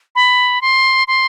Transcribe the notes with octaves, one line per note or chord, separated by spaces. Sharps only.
B5
C6
C6